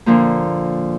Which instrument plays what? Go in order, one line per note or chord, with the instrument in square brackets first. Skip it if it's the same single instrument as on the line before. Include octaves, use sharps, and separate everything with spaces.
[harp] A#2 D3 F3 A#3